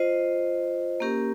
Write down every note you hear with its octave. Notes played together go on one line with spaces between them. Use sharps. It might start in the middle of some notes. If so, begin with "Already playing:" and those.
Already playing: F4 C5 D#5
A#3 C#4 G4 A#4